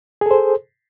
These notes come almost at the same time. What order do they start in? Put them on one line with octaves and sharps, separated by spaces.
G#4 A4 C5